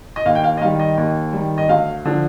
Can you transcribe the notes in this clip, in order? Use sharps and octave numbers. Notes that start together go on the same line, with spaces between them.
D#5
D#2 F5
G5
F5
D#5
D#3 G3 F5
D#5
D#2
D#3 G3
D#5
D2 F5
D3 F3